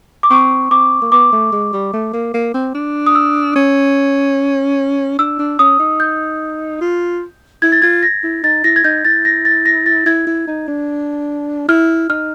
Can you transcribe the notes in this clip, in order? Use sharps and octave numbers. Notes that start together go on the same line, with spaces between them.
D6
C4 C#6
C4 D6
A#3
B3 D6
A3
G#3
G3
A3
A#3
A#3
C4
D4
D#6
E6
C#4
D4 E6
D4
C#4 D#6
D#4
G6
F4
E4 G#6
A6
F4 G#6
A#6
E4
D#4 A6
E4 A#6
G#6
D#4 G6
E4 A6
A#6
A6
A#6
A6
E4 G#6
E4
D#4
D4
E4 F6
D#4 F6